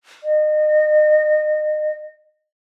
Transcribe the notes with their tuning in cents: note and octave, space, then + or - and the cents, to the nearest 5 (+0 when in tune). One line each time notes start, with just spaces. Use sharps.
D#5 -30